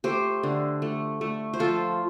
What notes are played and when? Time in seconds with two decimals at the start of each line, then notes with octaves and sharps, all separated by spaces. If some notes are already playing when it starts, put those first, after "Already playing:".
0.04 A3 G4 C5
0.43 D3
0.82 A3
1.21 A3
1.54 C5
1.59 F3 F4 A4